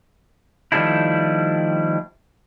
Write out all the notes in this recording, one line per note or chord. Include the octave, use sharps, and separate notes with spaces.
D#3 F3 G3 A3 D4 E4